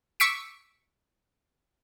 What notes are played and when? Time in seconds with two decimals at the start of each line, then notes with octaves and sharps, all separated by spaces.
0.20 C#6 D6 E6 B6 C#7 D7